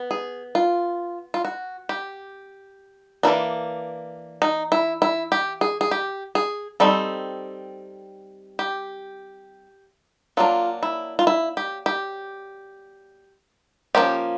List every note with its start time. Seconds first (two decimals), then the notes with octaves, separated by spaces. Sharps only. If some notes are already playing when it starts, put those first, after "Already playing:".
Already playing: B3
0.11 G#4
0.55 F4
1.34 F4
1.45 F#4
1.89 G4
3.23 E3 G3 A#3 D4
4.42 D#4
4.72 E4
5.02 E4
5.32 G4
5.61 G#4
5.81 G#4
5.91 G4
6.35 G#4
6.80 G3 C4 D#4 A4
8.59 G4
10.37 F#3 A#3 D4 F4
10.83 E4
11.19 F4
11.27 E4
11.57 G4
11.86 G4
13.95 F3 A#3 C#4 G4